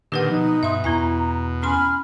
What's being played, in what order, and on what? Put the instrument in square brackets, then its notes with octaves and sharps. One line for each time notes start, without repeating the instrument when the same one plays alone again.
[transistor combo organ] A#2 D3 D#3 [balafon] G4 B4 F#5
[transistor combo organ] B2 [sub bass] F3 [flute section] D#4
[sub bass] G2 [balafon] E5 C6
[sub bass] E2 [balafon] B3 E4 G#5 [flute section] A#5
[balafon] C#4 C6 [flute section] G#5 B5 F6